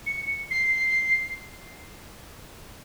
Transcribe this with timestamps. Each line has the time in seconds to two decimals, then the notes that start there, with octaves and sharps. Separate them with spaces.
0.06 C#7
0.51 C7